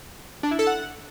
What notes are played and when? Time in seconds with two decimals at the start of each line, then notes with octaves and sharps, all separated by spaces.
0.43 D4
0.51 E4
0.59 A4
0.67 F#5